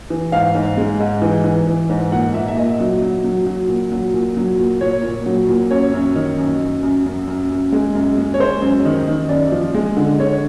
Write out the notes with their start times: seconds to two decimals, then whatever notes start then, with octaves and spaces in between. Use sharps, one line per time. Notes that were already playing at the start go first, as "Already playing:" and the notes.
0.10 E3
0.32 G#2 F5
0.55 G#2
0.77 G#3
1.00 G#2
1.22 E3
1.44 E3
1.67 E3
1.90 G#2
2.12 A#2 F#5
2.34 A#2 E5
2.48 E5
2.57 A#2 D#5
2.80 F#3
3.02 F#3
3.24 F#3
3.46 F#3
3.68 A#2
3.92 F#3
4.14 A#2
4.37 F#3
4.58 A#2
4.81 A#2 C#5
5.03 A#2
5.26 F#3
5.49 A#2
5.71 F#2 C#5
5.94 F#2
6.16 D#3
6.38 F#2
6.61 F#2
6.83 F#2
7.06 F#2
7.27 F#2
7.51 F#2
7.72 G#3
7.95 F#2
8.18 G#3
8.34 C#5
8.40 G#3 C5
8.62 F#2
8.85 D#3
9.07 D#3
9.29 F#2 D5
9.52 F3
9.74 G#3
9.97 D3
10.19 D3 C#5